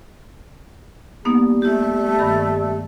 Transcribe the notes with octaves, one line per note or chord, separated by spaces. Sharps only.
G3 A#3 B3 D#4
A3 E4 G4
G2 D#3 B5